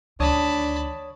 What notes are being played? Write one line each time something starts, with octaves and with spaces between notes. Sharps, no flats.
D2 D#3 D4 C#5 A5 B5 D#6